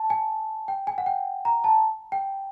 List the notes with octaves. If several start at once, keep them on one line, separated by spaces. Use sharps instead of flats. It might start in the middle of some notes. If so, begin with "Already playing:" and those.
Already playing: A5
G#5
G5
G#5
F#5
G5
A#5
A5
G5